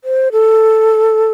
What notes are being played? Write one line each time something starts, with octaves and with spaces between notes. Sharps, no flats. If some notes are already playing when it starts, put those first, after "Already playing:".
C5
A4